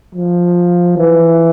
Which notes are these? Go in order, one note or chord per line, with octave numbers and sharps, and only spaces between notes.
F3
E3